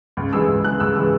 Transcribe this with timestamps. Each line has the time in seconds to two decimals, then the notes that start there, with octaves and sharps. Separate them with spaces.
0.17 C#2
0.33 C#3 E3 G#3 E6
0.48 C#2
0.64 C#3 E3 G#3 F#6
0.80 C#2 E6
0.95 C#3 E3 G#3 E6